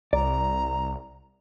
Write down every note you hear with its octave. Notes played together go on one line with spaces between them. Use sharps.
C2 D5 A#5